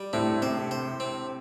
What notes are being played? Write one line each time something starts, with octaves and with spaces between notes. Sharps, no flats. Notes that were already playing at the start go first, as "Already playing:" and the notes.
Already playing: G3
A2 C4
C3 C5
C5
C4